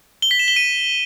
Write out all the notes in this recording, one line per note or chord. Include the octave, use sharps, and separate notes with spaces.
G7
B6
E7
G7
D#7